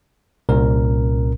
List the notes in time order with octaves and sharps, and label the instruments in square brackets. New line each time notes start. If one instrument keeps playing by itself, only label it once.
[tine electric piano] C2 A#2 C#4 A#4